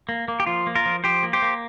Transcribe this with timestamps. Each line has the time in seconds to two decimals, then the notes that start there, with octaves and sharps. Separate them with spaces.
0.09 A#3
0.28 A#3
0.40 G4
0.46 F3 F4
0.67 A#3
0.75 F4 A#4
0.86 F3
1.04 F3 G4 C5
1.23 A#3
1.33 G4 C5
1.42 A#3